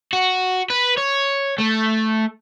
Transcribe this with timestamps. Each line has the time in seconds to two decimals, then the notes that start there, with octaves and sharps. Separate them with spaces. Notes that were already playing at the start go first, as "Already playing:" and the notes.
0.13 F#4
0.70 B4
0.98 C#5
1.58 A3